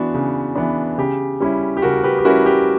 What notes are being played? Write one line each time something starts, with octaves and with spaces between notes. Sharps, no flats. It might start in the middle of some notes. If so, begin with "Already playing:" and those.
Already playing: E3 B3 D4 F#4
C#3
E3 B3 D4
C#3 G4
G3 C#4 E4
G4
C#3 F#4 A#4
G4 B4
G4
G3 C#4 E4 F#4 A#4
G4